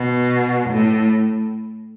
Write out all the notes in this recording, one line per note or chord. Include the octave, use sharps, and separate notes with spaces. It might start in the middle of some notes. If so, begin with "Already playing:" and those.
Already playing: B2
A2